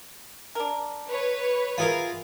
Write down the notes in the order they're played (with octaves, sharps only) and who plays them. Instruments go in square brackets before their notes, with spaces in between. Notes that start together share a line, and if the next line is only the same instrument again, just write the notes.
[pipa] D4 A#4
[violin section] B4 C#5
[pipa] F#3 B3 E4 [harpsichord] F4 G#4 A#4